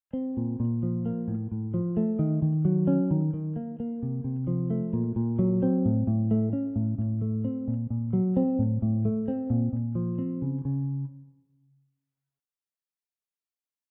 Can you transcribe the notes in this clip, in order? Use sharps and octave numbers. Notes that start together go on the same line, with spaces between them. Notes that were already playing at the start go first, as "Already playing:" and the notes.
C4
A#2
A#2
F3
A#3
A2
A2
F3
A3
D#3
D#3
F#3
C#4
D#3
D#3
A#3
A#3
C3
C3
F3
A3
A#2
A#2
F#3
C4
A2
A2
A3
C#4
A2
A2
A3
C4
A#2
A#2
F#3
C4
A2
A2
A3
C4
A#2
A#2
F3
C4
C#3
C#3